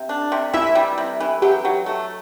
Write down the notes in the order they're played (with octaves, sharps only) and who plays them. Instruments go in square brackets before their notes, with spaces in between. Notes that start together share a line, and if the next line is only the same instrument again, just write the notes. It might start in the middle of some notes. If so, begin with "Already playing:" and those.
Already playing: [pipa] C3
D4
C3
[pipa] E3 [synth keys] E4 E5
[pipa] G3
C3
E3
[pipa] F#3 [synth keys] G4 G5
[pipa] F#3
A3